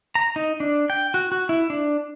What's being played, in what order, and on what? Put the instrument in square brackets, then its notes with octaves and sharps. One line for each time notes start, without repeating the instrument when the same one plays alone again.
[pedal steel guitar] A#5
D#4
D4
G5
F#4
F#4
E4
D4